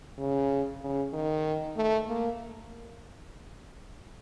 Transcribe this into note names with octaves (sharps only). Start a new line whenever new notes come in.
C#3
C#3
D#3
A3
A#3